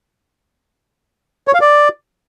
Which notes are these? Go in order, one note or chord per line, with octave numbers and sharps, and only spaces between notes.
C#5
F5
D5